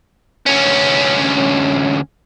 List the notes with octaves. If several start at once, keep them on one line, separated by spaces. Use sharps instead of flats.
D2 C#4